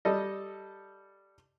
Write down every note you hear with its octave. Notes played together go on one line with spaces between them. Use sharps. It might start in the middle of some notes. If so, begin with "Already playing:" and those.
G3 A4 D#5